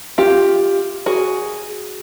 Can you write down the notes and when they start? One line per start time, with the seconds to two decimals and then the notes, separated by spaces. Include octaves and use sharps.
0.18 F4 G4
1.06 F#4 G#4